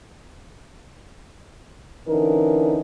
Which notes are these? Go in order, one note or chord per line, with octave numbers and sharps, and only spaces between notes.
D3 E3 C#4 D#4 A#4